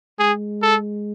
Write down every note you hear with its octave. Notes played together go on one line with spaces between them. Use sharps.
G#3 G#4
A4